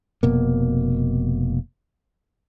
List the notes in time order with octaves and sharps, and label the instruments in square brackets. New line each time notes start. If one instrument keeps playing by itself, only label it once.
[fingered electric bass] F1 B2 A#3